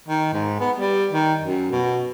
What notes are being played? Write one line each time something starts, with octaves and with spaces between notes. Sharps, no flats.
D#3
G#2
B3
G3
D#3
F#2
B2